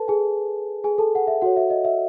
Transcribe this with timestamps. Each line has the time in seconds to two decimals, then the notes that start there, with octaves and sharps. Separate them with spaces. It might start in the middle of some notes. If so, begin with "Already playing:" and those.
Already playing: A4 B4 A5
0.08 G#4 G#5
0.84 G#4 G#5
0.98 A4 A5
1.15 F#5
1.27 E5
1.42 F#4 A4 C#5 F#5
1.57 E5
1.70 D#5
1.84 E5